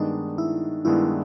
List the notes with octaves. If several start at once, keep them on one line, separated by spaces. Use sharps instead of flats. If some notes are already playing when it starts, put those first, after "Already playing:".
Already playing: G2 D#3 G#3 B3 D4 D#4
E4
G2 D#3 G#3 B3 D4 E4